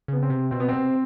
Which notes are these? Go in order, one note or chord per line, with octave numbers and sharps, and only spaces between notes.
C#3 B3
C4
C3
B2 C4
B3
C3 C4